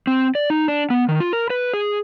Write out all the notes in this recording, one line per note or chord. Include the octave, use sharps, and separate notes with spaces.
C4
D5
D#4
D4
B3
D#3
F4
A#4
B4
G#4